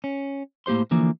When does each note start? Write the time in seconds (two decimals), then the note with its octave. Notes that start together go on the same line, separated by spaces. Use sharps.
0.04 C#4
0.66 A2 A#3 G4 C5 C6
0.91 D3 E3 F3 A#3